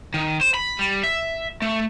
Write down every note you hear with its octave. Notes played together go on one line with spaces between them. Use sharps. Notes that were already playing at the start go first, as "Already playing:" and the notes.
D#3
C5
B5
G3
E5
A3